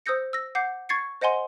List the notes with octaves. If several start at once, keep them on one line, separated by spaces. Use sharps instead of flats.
C5 D#6 E6 G6 A#6 C#7
E6 A#6
F#5 D6 G6 C7
C#6 G#6 A6 C7 C#7
C5 D#5 F#5 G#5 C6